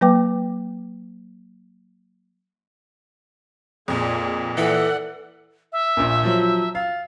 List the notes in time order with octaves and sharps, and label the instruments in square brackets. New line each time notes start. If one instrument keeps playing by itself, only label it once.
[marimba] F#3 A#3 B4 G5 D6
[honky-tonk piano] F2 A#2 [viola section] F4 G#4
[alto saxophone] E3 [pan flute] A4 [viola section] D5 F#5
[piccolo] E5
[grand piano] A#1 A#2
F3 F#3
[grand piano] F5 [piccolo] A6